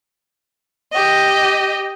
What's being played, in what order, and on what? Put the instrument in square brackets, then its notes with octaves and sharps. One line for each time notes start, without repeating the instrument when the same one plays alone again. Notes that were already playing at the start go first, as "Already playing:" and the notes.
[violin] G4 D#5